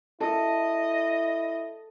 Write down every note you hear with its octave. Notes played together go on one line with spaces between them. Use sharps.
E4 A4 D#5